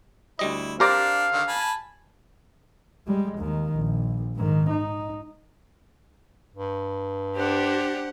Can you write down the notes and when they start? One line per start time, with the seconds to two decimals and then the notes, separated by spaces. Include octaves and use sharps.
0.39 D2 G3 E4 D#5
0.80 D4 G4 A#4 C5 D5 F5 A#5 D6
1.33 D3 D#3
1.48 G#5 A5 B5
3.07 G3 G#3
3.38 D#2 D#3
3.75 A#1
4.36 G#2 D#3
4.70 D#4
6.56 G2
7.36 D4 G4 C5 F#5